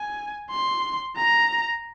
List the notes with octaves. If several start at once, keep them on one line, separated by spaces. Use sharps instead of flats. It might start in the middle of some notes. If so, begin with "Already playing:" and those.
Already playing: G#5
C6
A#5